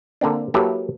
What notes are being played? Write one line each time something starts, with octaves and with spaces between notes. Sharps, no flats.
D3 A#3 C4 D4
F#3 A#3 E4 G4 A4 B4